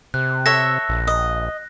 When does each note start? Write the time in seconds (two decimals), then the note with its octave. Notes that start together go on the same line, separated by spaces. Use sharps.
0.14 C3 F#6
0.46 A4 C#5 E5 A#6
0.89 A#1
1.07 D#5